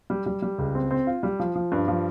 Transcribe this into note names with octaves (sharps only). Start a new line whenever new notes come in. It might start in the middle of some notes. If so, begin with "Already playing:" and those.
G3
G3
G3
C#2
C4
C4
F4
G3
F3
F3
G2
F3